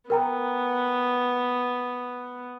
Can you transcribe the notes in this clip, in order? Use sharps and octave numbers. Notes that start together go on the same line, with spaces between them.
B3 A#4 G5 A#5